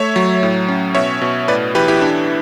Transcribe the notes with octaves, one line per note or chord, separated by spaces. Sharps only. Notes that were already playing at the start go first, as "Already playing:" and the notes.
Already playing: A3 C#5 E5
F#3
A2
C#4
B2 C#5 E5
B2
A2 B4 D5
E3 G4 B4
E4 G4
D4